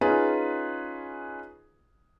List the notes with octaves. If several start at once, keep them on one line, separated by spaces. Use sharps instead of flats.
C#4 D#4 F4 G#4 B4